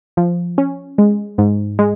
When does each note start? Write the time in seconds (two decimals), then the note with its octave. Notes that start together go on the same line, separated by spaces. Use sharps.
0.17 F3
0.58 C#4
0.98 G#3
1.38 G#2
1.79 G#3